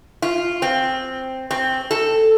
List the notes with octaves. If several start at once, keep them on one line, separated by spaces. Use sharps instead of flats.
F4
C4
C4
A4